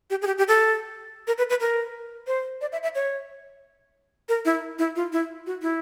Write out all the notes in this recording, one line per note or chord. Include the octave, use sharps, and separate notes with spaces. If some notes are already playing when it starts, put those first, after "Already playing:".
G4
G#4
G4
G4
A4
A#4
B4
B4
A#4
C5
D5
E5
E5
C#5
A#4
E4
E4
F4
E4
F#4
E4